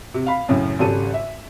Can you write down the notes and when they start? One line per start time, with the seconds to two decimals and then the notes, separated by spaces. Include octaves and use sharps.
0.14 C3
0.27 F5 B5
0.49 F#2 A2 C#3
0.79 G#1 C#3 G3 A4 D#7
1.14 E5